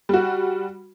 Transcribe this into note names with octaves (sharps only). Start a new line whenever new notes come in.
G3 F#4